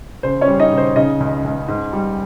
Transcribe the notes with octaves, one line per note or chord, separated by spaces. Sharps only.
C#3 C5
C#4 C#5
G3
D#4 D#5
C#3
C5
C#3 D#4 D#5
C#2
C#2
G#2
G3